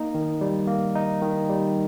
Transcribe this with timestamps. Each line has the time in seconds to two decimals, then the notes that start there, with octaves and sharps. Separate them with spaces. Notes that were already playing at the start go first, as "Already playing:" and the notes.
Already playing: A#3 D#4
0.15 D#3
0.41 G3
0.68 A#3
0.95 D#4
1.22 D#3
1.49 G3